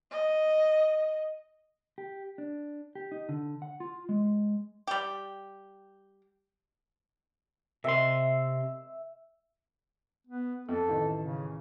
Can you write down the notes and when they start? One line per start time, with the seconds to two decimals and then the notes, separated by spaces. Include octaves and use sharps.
0.11 D#5
1.98 G4
2.38 D4
2.95 G4
3.12 D#4
3.29 D3
3.62 F#5
3.80 F4
4.09 G#3
4.87 G3 G4
7.84 C3 E5 C6
10.27 B3
10.69 F2 A4
10.88 A1 D#3
11.22 C#3